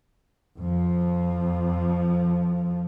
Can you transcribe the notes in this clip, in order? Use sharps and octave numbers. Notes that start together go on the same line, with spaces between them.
F2 F3